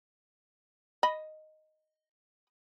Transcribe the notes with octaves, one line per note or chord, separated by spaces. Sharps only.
D#5 B5